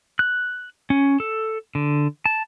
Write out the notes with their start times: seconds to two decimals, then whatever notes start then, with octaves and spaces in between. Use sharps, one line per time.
0.19 F#6
0.90 C#4
1.20 A4
1.75 D3
2.26 A5